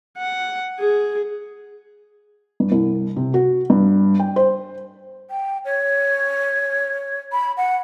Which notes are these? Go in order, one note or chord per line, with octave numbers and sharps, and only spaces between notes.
F#5
G#4
G2
C2
C3
F#4
G2
G5
C5
G5
C#5
B5
F#5